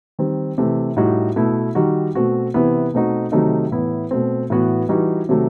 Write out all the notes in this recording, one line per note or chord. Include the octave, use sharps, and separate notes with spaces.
D#3 G3 C4
C3 E3 A3
A2 G3 D#4 F#4
B2 A3 E4
D#3 G3 D#4 F#4
B2 A3 C4 F#4
C3 E3 B3 E4
B2 A3 C4 D#4 F#4
C3 D#3 F#3 A3 D#4
A2 E3 B3 E4
B2 A3 C4
A2 E3 B3 F#4
E3 G3 D#4 F#4
C3 D#3 F#3 A3